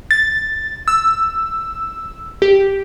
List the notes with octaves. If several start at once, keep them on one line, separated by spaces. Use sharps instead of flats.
A6
E6
G4